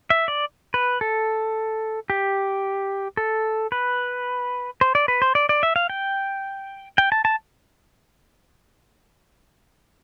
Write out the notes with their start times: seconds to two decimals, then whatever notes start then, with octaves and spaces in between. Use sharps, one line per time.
0.10 E5
0.28 D5
0.74 B4
1.01 A4
2.10 G4
3.17 A4
3.72 B4
4.81 C5
4.95 D5
5.08 B4
5.22 C5
5.35 D5
5.49 D5
5.63 E5
5.76 F5
5.90 G5
6.98 G5
7.12 A5
7.25 A5